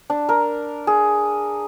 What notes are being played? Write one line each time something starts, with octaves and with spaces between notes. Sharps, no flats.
D4
A#4
G#4